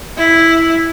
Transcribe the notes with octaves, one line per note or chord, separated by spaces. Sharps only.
E4